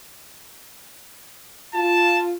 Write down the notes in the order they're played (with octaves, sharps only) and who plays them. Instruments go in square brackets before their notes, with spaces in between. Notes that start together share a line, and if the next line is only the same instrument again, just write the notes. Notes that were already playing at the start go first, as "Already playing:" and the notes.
[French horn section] F4 [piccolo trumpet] A5